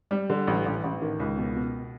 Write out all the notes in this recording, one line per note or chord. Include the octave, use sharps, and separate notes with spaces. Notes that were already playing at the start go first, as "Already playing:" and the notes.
G3
D3
A1
A1
A1
D#3
C#2
B2
B2